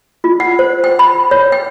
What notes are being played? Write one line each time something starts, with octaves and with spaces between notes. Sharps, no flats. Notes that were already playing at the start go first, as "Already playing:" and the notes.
F4
F#5
C5
G5
B5
C#5
G5